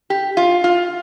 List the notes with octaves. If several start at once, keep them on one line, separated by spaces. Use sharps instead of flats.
G4
F4
F4